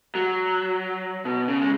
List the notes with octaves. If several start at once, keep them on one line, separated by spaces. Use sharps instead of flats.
F#3
B2
C#3
G#3